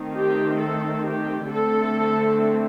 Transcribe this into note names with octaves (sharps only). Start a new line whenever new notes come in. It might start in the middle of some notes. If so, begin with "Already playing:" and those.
Already playing: D#3 A3 C4
G4
A4
G4
D3 A3 C4 A4